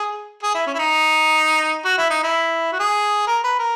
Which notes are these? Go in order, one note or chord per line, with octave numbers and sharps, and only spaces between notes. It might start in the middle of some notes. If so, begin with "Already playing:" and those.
Already playing: G#4
G#4
E4
C#4
E4
D#4
F#4
E4
D#4
E4
F#4
G#4
A#4
B4
A#4